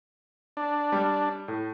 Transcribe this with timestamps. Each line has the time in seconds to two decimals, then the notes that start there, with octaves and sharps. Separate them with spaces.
0.57 D4
0.92 G3
1.48 A2